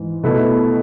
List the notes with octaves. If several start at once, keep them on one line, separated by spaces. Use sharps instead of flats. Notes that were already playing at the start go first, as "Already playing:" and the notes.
Already playing: G#2 E3
B2 A3 E4 B4